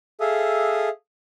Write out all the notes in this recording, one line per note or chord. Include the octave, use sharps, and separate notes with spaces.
G#4 A4 E5 F5 D#6